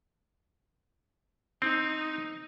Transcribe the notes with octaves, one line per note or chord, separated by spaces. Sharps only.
C4 D#4